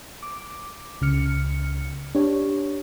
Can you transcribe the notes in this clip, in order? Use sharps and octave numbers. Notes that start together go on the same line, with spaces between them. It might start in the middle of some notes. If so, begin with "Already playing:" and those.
D6
C#2 C#3 F6 C#7
D4 G4 C#5